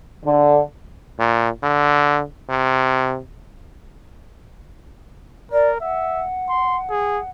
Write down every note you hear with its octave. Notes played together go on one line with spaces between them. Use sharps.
D3
A#2
D3
C3
A#4 D5
E5 F#5
C6
G#4